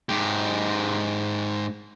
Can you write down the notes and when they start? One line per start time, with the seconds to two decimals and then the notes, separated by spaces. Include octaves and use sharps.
0.09 G#2 G4